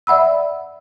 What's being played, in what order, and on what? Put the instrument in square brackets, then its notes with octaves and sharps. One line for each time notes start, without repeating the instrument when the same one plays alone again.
[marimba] D5 E5 F#5 B5 E6